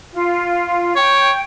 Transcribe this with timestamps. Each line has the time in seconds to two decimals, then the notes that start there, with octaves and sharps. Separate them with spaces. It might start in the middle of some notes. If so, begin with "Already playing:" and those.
0.13 F4
0.96 C#5 G5